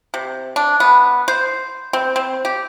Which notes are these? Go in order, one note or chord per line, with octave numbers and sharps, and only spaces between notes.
C3
D4
B3
C5
C4
C4
G4